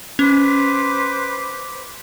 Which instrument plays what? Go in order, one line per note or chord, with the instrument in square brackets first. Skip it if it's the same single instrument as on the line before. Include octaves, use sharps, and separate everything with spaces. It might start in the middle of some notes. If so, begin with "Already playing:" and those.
[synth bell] C#4 [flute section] B4 C5 D6